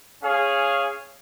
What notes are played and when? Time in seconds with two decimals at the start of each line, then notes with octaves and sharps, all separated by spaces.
0.23 C#4 G#4 C#5 F5